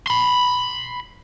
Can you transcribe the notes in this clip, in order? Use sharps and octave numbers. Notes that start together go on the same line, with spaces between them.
B5 C6